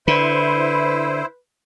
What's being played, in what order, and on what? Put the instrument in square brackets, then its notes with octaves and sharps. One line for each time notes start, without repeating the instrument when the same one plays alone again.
[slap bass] D3 [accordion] E4 C5 [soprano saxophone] B4